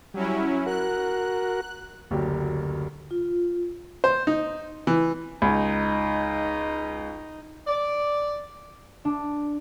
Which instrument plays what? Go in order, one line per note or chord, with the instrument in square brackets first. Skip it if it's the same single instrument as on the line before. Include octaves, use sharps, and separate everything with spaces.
[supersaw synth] F#3 C#4 E4 [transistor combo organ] G3
[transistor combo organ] F#4 A#4 [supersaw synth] F#6
[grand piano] F#1 D2 D3 F#3 G4
[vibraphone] F4
[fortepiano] C5
D#4
E3
[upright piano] C#2 [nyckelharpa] D#4
[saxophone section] D5
[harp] D4